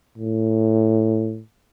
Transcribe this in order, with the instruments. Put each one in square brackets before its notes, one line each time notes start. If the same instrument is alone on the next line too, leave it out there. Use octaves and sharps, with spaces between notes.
[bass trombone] A2